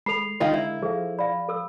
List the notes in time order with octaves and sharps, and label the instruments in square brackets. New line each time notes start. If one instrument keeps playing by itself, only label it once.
[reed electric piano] G#3 [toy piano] A4 B5 [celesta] C7 F7
[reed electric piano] D3 G#3 A#4 [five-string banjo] D#3 D#4 F4 [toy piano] F5
[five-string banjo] E4
[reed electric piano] F3 [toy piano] G#4 [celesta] A4 C5 F5
[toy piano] D5 [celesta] F5 B5
[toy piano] A4 E6